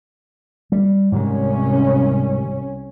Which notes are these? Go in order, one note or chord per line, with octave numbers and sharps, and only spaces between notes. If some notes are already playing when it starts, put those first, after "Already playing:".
G3
C2 G#2 C3 D#3 C#4